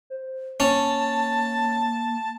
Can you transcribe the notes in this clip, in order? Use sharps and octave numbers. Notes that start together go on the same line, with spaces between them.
C5
A#3 C#4 A5